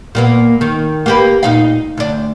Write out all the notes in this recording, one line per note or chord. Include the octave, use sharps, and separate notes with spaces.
A#2 A#3 B3
D#3
A#3 G4 B4
A#2 D#4 F5
D2 D4